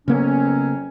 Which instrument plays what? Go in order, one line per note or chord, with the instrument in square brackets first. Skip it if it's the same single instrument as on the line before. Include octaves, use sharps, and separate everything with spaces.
[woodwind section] F2 F#3 C#4 [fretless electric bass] C#3 A#3 B3